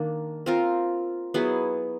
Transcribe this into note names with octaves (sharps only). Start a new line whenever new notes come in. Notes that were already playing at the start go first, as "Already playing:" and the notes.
Already playing: D#3 A#3 D4
C4 F4 A#4
F#3 B3 E4 G#4